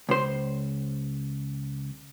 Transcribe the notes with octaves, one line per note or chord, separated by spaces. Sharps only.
C#2 C5